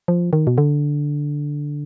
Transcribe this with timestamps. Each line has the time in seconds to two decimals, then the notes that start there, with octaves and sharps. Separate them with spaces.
0.08 F3
0.33 D#3
0.47 B2
0.58 D3